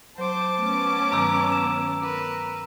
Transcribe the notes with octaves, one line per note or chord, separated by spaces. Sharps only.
F#3 C5 A5 D6
A3 B3 C#4
G2 D#3 F#3 A#5 E6
E7
A#4 B4